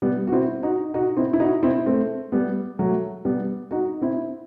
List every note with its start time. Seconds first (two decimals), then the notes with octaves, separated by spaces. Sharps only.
0.02 G3 B3
0.27 F#4
0.32 C4 E4
0.63 D#4 F#4
0.94 D#4 F#4
1.17 C4 E4
1.33 E4
1.40 D#4 F#4
1.63 C4 E4
1.86 A3 C4
2.32 G3 B3
2.79 F#3 A3
3.25 G3 B3
3.71 D#4 F#4
4.02 C4 E4